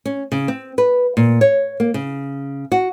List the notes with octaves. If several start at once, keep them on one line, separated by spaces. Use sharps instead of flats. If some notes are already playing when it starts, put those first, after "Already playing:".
C#4
C#3
C4
B4
A#2
C#5
A#3
C#3
F#4